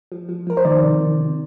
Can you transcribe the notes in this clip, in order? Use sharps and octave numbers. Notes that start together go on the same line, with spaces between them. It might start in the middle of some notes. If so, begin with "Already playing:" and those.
F3
F3
F3 A#4
C5
D#3 D5
C3
D#3
C3